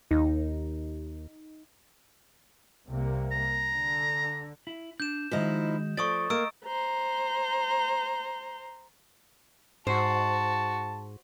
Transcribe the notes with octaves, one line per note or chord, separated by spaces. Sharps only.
D#2 D#4
C2 C3 A#3
A#5
D3
E4
D4 G6 E7
D#3 F3 G#3 D#4 E4 F#4
F3 A3 D5 C#6 D#6 A6
A#3 D#5 A#5 E6 D7
C5 A#5
G#2 F#4 C5 A5